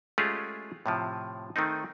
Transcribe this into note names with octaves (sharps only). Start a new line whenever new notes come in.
G#3 A3 C#4 F4 G4 G#4
A2 C3 F3
D#3 A3 C4 D#4